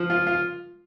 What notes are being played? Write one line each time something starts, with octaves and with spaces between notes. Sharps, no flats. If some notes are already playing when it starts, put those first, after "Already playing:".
Already playing: F3
F4
F4